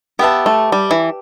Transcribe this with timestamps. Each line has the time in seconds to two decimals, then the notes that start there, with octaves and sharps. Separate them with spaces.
0.19 B3 G4 B4 E5 A5
0.46 A3
0.72 G3
0.91 E3